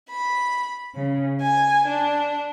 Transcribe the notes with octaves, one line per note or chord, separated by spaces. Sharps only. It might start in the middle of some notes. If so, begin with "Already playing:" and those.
B5
C#3
G#5
D4